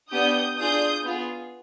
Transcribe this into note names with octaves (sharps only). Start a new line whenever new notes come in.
B3 D4 G4 D#6 G6
D4 F4 G#4 D#6 G6
B3 F4 G#4